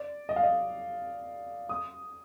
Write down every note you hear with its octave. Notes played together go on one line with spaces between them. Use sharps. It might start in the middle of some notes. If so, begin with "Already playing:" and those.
Already playing: D5
D#5
F5
D#5
D#6